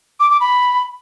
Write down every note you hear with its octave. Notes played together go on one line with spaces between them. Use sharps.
D6
D6
B5